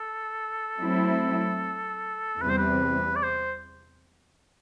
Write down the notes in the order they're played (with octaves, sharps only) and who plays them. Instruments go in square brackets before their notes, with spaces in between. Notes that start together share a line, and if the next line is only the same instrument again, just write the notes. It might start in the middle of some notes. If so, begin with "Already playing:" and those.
Already playing: [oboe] A4
[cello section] F#3 A3 C4 E4
[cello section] E2 C3 G3 C4 [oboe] B4
[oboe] C5
B4
D5
C5